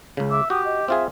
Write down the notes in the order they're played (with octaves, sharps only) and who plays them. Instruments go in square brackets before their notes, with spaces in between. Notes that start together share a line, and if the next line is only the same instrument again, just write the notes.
[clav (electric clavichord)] C#2 C#3
[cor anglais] E5 [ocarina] D6
[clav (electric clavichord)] F#4 [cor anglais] G4 [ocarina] D#6
[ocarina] D#5
[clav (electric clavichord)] C4 F4 G#4 [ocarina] E5